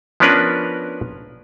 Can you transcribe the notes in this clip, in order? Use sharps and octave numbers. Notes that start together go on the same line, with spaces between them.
F3 B3 C#4 D4 A#4 B4